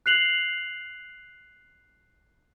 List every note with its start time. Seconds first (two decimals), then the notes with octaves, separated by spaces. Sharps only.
0.06 F#6 C7 F7 F#7